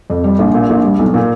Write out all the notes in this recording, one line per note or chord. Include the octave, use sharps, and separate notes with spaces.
F2
G3
A#1
A#2
A#1
G3
B1
A#2